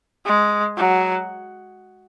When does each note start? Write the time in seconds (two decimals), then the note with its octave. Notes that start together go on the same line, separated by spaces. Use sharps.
0.26 G#3
0.77 F#3